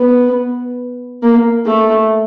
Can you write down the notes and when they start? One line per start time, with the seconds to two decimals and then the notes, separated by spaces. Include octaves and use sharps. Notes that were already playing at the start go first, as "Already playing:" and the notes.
Already playing: B3
1.22 A#3
1.66 A3